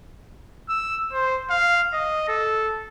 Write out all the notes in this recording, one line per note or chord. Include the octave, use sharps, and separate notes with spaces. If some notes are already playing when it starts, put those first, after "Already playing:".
E6
C5
F5
D#5
A4